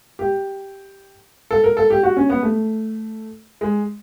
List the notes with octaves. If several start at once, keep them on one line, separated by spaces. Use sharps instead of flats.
G4
A4
A#4
A4
G4
F#4
C#4
B3
A3
G#3